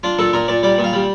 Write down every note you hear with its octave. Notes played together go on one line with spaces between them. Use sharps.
D4 F4
A#2 A4
A#2 A#4
A#2 D5
G3 D5
A#2
F5
G3